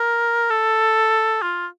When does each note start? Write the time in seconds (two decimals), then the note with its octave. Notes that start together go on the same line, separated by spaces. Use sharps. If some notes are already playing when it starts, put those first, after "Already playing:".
Already playing: A#4
0.50 A4
1.42 F4